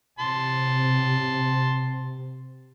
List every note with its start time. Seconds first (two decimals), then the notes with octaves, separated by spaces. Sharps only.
0.19 C3 A5 C6